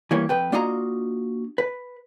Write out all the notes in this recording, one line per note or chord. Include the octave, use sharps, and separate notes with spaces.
E3 G3 A#3 C#5
F2 B4 G5
A#3 D4 F4 F#4 D#5 A#5
B4